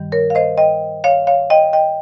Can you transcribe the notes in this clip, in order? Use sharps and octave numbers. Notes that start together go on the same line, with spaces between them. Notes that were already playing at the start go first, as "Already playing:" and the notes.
Already playing: G2 D#3 G3
A#4 C#5
F5
C5 D#5
D#5 G5
C#5 F5
C#5 F5
D#5 G5
D#5 G5